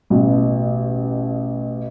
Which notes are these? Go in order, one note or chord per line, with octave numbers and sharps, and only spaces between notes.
A1 B2